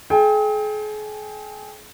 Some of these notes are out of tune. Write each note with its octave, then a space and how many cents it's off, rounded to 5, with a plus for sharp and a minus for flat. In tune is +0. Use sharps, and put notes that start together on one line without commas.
G#4 +40 G5 +25